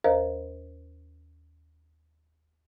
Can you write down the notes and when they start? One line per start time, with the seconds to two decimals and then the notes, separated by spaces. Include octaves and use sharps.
0.04 D#2 A#4 C5 D#5 A#5